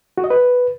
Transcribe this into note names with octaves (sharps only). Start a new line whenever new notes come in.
F#4
D#5
B4